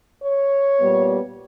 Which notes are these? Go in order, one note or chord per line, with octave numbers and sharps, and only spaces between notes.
C#5
A#2 G3 B3